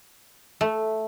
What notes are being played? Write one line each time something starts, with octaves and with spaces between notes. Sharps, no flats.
A3